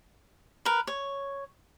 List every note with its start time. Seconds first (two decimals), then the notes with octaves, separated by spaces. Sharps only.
0.65 A#4 B4
0.87 C#5